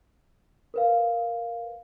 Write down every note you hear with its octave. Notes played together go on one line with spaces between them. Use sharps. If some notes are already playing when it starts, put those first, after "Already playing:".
A#4 B4 F5